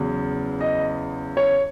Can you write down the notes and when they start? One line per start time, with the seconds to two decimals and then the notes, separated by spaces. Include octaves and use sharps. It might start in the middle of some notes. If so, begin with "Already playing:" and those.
Already playing: E2 C#3 F#3
0.61 D#5
1.37 C#5